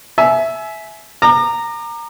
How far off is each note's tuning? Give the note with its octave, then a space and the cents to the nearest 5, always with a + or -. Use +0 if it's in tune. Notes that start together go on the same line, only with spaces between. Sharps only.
E5 +0 G#5 +30
A#5 -10 D6 +35